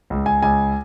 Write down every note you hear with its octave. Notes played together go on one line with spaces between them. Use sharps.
C#2
G#5
C#2 G#5